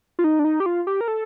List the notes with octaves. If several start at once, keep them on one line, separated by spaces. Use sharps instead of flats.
F4
D#4
D4
D#4
G4
F4
G4
A#4
A4